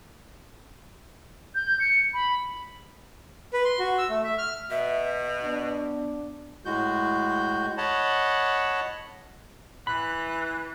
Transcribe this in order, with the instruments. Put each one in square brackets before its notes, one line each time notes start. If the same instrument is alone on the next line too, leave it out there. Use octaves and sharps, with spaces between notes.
[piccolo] G6
C#7
B5
[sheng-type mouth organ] B4
C6
F#4
E6
A3
E5
F6
[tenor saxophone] B2 [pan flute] E5
[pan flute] B3 [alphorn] D4
[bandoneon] A2 G#3 F#4 G6
C#5 D#5 F#5 A5 B5
[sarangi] E3 [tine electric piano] B5 [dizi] F#6